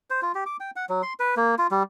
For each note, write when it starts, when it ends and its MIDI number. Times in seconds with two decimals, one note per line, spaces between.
0.10 0.21 72
0.22 0.32 65
0.35 0.44 67
0.46 0.57 86
0.60 0.71 79
0.76 0.85 78
0.89 1.02 54
1.03 1.13 84
1.20 1.35 71
1.37 1.55 58
1.58 1.67 65
1.71 1.83 55